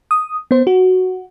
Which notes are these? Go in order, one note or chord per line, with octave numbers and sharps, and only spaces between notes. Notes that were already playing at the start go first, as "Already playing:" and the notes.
D#6
B3 C5
F#4